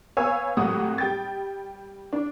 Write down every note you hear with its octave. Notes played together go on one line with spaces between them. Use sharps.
B3 C#5 F5 G#5 E6
G#1 A2 C3 F#3 F#4 D#6
G3 G5 A6
D4